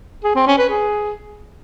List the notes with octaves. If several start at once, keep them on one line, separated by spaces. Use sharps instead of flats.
G#4
C4
C#4
B4
G#4